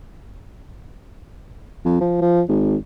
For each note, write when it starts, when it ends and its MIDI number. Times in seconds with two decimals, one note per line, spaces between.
1.85 1.99 41
2.01 2.21 53
2.22 2.41 53
2.48 2.75 32